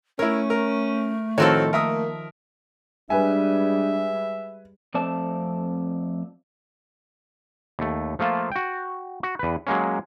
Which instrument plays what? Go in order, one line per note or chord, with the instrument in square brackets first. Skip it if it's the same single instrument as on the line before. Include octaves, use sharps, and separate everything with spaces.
[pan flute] A3 [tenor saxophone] C#4 [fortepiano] E4 A#4 [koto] C#5
[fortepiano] A#4
[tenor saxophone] A2 [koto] D#3 F3 A4 [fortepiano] C4 F#4 C#5
[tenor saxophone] A#3 [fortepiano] A#4 E5 D#6
[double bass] G3 G#3 [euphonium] D4 [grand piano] B4 G#5 [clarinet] E5
[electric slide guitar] F2 A3 C4 D5 A5
[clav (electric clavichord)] D#2 A3
F3 A3 A#3 F4 A5
F#4 G5
F#4
E2 B4
F#3 G#3 A#3 C#4